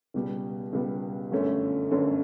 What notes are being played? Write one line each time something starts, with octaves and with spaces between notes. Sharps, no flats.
C#2 B2 G3 B3
C#2 B2 G3 B3
G1 F#2 D3 A3 C#4
G1 F#2 D3 A3 C#4